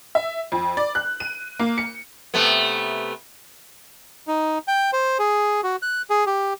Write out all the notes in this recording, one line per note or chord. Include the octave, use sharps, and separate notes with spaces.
E5
F2
D5
F#6
D#7
A#3
C#7
C3 A3 B3
D#4
G5
C5
G#4
F#4
F#6
G#4
G4